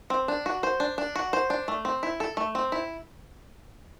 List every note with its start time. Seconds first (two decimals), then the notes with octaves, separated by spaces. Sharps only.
0.10 C4
0.28 D4
0.46 F#4
0.63 C5
0.80 D4
0.98 D4
1.16 F#4
1.33 C5
1.50 D4
1.68 A3
1.85 C4
2.03 E4
2.20 A4
2.37 A3
2.55 C4
2.72 E4